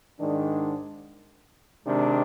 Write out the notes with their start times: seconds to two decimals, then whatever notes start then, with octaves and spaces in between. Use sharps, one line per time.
0.18 G#2 D#3 G#3 D4
1.86 C3 D#3 G#3 D4